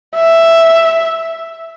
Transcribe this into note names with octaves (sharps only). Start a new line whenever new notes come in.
E5